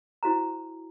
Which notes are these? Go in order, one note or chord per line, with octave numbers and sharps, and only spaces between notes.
E4 F#4 C5 A#5